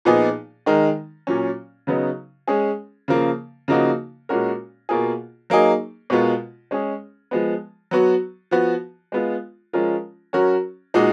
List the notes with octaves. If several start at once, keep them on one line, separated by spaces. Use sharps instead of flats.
A#2 F3 B3 D#4 G#4
D#3 G#3 D#4 A#4
A#2 F#3 C#4
C#3 F#3 B3 D#4
G#3 C#4 G#4
C#3 F3 A#3
C#3 F3 A#3 D#4 F#4
A#2 G#3 C#4 F#4 A#4
B2 A#3 F4 G#4
F#3 A#3 D#4 G#4
B2 G#3 B3 F4 A#4
G#3 C#4 G#4
F3 G#3 B3
F#3 B3 F#4
F3 B3 F#4
G#3 B3 F4
F3 G#3 C#4 F4 A#4
F#3 C#4 F#4 A#4
A#2 G#3 D#4 F#4